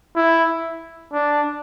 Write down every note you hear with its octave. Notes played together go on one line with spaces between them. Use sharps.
E4
D4